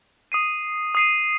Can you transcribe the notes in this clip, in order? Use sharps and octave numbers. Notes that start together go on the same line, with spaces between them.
D#6 C7 D#7
D#6 C7 D#7